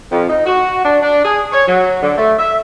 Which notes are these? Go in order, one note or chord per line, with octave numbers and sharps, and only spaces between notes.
F2
D#4
F#4
D4
D4
G#4
C#5
F#3
D3
A3
E5